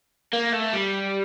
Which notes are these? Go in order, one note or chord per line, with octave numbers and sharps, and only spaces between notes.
A#3
A3
G3